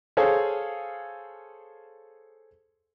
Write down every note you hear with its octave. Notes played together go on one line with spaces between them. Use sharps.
G#4 A4 C5 C#5 F5